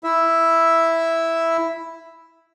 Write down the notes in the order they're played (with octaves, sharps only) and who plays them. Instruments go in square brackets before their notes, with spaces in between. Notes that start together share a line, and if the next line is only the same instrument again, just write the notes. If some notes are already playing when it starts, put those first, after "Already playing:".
[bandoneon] E4 E5